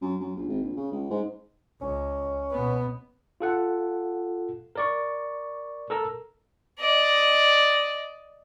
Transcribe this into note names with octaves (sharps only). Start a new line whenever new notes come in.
F#2
F#2
A#1
G#1
A#1
C#3
C#2
G#2
C#2 C#4
B2 B3
F4 A4 F#5
A#4 D5 C#6
A4 A#4 A#5 E6
D5 D#5